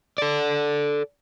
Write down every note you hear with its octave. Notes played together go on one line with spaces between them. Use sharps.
A4 D5